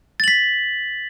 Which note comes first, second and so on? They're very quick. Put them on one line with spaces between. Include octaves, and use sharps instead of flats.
A6 F#7 B6